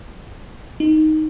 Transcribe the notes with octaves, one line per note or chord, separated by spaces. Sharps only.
D#4